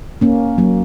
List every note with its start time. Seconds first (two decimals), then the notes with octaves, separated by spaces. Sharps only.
0.21 A#3 C#4
0.58 F#3 A#3